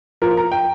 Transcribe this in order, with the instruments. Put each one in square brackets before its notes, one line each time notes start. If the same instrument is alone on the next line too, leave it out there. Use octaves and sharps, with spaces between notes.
[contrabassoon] F3 [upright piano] A#4
[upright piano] A#5
G5